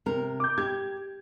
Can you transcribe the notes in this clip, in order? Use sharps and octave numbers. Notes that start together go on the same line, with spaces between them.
C3 A#4
D6 G6
G4 G#6